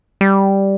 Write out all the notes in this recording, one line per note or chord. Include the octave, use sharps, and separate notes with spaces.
G3